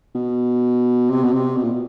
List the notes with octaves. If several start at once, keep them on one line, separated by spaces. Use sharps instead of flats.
B2
C3
B2
C3
B2
A#2
B2